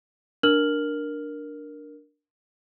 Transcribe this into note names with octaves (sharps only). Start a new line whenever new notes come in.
D4 A#4 F6 F#7